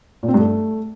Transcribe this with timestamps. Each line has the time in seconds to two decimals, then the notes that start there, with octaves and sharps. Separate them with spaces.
0.23 A#2
0.28 C4
0.34 G2
0.39 A3